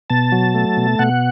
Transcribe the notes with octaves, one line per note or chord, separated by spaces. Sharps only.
B2 A5
F#3
A3
B2
B2 F#5